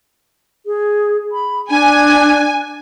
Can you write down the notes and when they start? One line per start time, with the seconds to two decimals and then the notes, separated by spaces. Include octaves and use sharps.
0.66 G#4
1.32 B5
1.70 D4 G#5